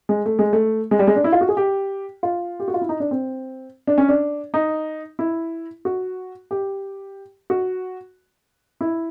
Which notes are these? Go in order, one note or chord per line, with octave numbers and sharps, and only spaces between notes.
G#3
A3
G#3
A3
G#3
G3
G#3
D4
E4
F4
F#4
G#4
G4
F4
G4
F#4
F4
E4
D#4
D4
C4
D4
C#4
D4
D#4
E4
F#4
G4
F#4
E4